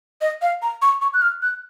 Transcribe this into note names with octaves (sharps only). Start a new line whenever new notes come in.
D#5
F5
A#5
C#6
C#6
F#6
F6
F#6